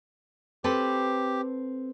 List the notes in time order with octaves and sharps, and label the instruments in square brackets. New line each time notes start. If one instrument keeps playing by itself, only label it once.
[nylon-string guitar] C4 A4 B4 [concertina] G4